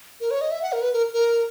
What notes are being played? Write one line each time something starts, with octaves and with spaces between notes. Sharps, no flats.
A#4
C#5
D#5
E5
F#5
A#4
B4
A#4
A#4